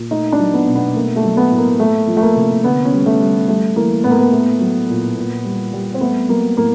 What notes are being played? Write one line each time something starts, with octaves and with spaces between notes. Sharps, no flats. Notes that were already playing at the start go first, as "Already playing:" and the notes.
Already playing: A#2
A3 D#4
D4
F#3
B3
B2
B3
A3 A#3
A3
F#3
B3
A2
A#3
A3
F3
A3
A#3
C3
D3 B3
C#4
G3
A3
G3
G3 A3
E3 A#3
A2 B3
A#3
B3
A3
F#3
A#2
A#2
G3
G3
C4
A3 B3
F#3 A#3
A2 A#3